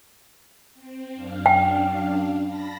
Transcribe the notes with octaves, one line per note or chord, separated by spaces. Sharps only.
C4
F#2 D4 F5
G5
A5 B5 A#6